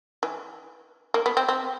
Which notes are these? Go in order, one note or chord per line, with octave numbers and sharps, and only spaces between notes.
E3
A#3
B3
C4
C4